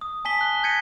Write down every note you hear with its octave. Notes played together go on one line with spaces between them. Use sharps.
D#6
G#5 A5 B6 G7
F#6
G6 G#6 A#6 B6 C#7 D#7